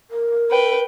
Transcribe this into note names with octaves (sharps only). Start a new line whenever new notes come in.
A#4
B4 G5